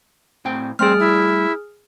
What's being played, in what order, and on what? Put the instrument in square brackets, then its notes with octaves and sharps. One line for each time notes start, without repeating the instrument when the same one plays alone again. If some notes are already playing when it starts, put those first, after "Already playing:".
[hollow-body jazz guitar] A2 C4 G5
[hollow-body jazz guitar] G3 A3 [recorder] C4 [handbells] G#4 F6
[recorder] E4